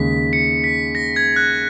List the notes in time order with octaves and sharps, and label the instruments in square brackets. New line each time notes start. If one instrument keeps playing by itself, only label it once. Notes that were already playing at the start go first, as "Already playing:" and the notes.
Already playing: [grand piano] D#2 C#3 G#3 [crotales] B6
[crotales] C#7
B6
A#6
G#6
F#6